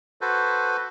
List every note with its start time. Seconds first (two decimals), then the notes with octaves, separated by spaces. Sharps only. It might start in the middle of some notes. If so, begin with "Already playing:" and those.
0.21 F#4 A4 B4 C5